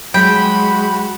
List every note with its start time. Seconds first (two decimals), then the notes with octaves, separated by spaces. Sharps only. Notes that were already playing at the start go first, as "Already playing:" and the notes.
0.14 F#3 G#3 F#4 G#4 G5 B5